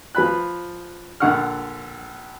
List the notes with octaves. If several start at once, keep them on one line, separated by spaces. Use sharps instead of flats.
F3 B4 B5 F#6
A#1 D3 F#5 C#6 F6